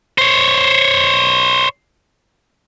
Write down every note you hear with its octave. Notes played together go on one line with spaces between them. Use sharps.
C5 C#5